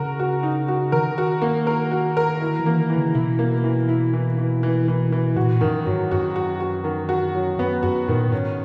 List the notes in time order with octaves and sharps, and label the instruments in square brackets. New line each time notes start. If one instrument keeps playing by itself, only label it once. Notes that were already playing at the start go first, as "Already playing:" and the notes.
Already playing: [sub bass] C#3 [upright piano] F#4 A#4
[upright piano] F#4
D#4
F#4
[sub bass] D#3 [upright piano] A#4
[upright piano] F#4
A#3
A#4
F#4
A#4
E4
[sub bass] E3
[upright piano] A#3
[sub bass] D#3
[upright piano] E3
[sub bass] C#3
[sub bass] B2 [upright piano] E4
[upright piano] A#3
E3
E4
E3
E3
E3
E3
E3
[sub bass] A#2 [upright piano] F#4
[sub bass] F#2 [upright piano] D#3
[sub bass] G#2 [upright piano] F#3
[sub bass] F#2 [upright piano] F#4
[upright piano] F#4
F#4
D#3
F#4
F#3
[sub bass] F#2 [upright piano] B3
[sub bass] F#2 [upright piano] F#4
[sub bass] A#2 [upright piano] D#3
[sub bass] A#2
[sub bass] G#2 [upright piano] C#4